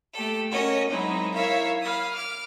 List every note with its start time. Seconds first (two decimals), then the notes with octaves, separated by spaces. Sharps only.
0.13 A3 G4 A4
0.51 C#4 F#4 A#4 C#5 D#5
0.90 F#3 G#3 C4 D#4 E4
1.34 E4 A#4 C#5 E5 F5
1.81 F5 B5 D#6
2.14 D6 F6